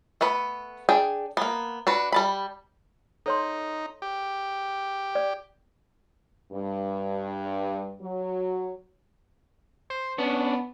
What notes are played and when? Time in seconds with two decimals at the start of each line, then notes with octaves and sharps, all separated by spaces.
0.21 A3 B3 B4
0.89 D4 G#4 G5
1.37 A#3 B3
1.87 D4 F#4 B4
2.12 G3 A5 B5
3.26 D#4 A4 C#5 C6
4.02 G4
5.15 D5
6.52 G2
8.01 F#3
9.90 C5
10.18 B3 C#4 D4